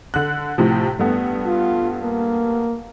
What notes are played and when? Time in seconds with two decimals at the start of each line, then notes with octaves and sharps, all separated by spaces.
0.14 D3 F#6
0.58 A2 C3 F3
0.99 G2 A3 B3
1.46 F4
2.02 A#3